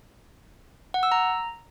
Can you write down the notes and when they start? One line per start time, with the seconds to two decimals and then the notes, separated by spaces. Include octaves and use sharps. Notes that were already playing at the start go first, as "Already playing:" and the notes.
0.94 F#5
1.03 E6
1.12 A#5